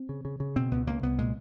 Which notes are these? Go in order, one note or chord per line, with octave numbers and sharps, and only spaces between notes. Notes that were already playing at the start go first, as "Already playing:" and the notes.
Already playing: C4
C#3
C#3
C#3
B2 C4
C#2 B3
C#2 A#3
C2 B3
A#2 G#3